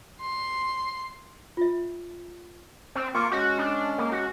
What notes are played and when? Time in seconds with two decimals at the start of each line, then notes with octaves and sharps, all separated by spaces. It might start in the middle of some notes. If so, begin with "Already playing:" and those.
0.21 C6
1.57 F4 E5
2.95 C4
3.14 A#3 F4 C#6 D6
3.31 G#3 C#4 F#4
3.59 D4
3.98 A#3
4.12 F#4